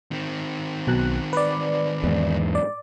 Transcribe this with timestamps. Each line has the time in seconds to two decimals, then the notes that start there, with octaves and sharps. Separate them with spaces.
0.12 D#3 C4
0.87 B1 B2 F#6
1.33 B4 D5
2.04 E2 G#2
2.55 D5